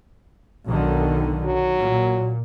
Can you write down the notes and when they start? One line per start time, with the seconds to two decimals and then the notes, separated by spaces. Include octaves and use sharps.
0.68 B1 D3 D#3
1.45 F#3
1.78 A#2